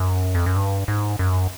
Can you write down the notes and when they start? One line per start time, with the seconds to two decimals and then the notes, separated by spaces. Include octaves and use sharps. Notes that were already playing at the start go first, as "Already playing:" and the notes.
Already playing: F#2
0.35 F2
0.46 F#2
0.56 G2
0.88 G#2
1.19 F#2